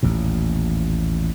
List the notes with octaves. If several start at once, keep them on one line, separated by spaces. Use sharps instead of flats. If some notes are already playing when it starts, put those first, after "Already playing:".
A1 D#2 A#2